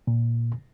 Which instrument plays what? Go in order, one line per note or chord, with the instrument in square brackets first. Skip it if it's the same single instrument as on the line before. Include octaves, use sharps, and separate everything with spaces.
[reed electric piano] A#2